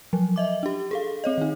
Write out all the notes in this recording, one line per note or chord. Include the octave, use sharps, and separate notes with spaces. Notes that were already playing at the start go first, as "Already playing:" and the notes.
F3 F#3
D#5 E5 D6
D4 G4
G#4 A4 F5
C4 C#5 D#5
D#3 D#4